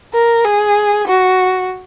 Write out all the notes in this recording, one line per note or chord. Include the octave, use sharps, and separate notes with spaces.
A#4
G#4
F#4